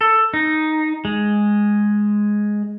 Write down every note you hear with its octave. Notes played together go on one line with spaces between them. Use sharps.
A4
D#4
G#3